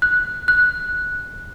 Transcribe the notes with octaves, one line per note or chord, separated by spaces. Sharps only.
F#6
F#6